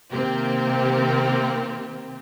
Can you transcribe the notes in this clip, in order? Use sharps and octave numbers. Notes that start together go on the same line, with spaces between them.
C3 D#3 A#3 C4 G4